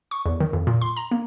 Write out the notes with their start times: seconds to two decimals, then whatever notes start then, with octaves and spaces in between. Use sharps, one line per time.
0.11 C#6
0.26 E2
0.40 D#3
0.53 F2
0.67 A#2
0.81 C6
0.97 A#5
1.11 A#3